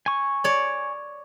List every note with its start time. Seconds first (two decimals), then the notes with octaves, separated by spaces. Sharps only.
0.06 G#5 C#6
0.44 C#5 D5